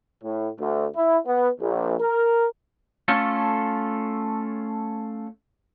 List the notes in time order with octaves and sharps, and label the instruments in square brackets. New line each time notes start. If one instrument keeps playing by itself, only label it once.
[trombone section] A2
D2
E4
B3
A#1
A#4
[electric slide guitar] A3 C#4 F4 A4